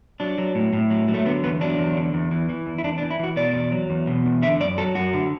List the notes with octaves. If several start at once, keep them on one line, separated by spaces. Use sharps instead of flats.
F#3 D4
F#3
A2
A2
F#3
F#3
A3
D3 B3
E2 B3
F#3 D4
E2
D3
E2
E3
E3
E2
E4
E2 D4
D4
E3
E4
E3 F#4
B2 D5
E2
F#3
E2
B2
E2
D3 E5
F#2 D5
F#3 A4
F#2 F#4
D3